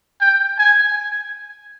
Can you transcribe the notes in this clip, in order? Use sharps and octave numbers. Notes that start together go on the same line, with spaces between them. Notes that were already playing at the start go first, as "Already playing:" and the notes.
G5
G#5